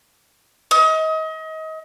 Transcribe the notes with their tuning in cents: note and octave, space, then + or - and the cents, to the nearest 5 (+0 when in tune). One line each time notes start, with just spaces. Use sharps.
D#5 +30